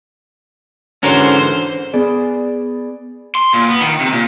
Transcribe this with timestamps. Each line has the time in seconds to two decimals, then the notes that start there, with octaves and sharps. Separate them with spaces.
1.03 G#2 D3 E3 C#4 F#4 A#4 C5
1.93 B3 G#4 D5
3.35 C6
3.54 A#2
3.68 B3
3.81 D#3
4.00 C3
4.13 A#2